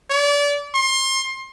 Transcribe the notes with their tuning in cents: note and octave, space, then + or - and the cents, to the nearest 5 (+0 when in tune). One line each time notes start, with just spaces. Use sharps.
D5 -30
C6 +25